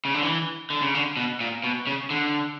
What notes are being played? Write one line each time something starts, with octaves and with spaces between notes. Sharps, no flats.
C#3
D3
E3
D3
C#3
D3
B2
A#2
B2
C#3
D3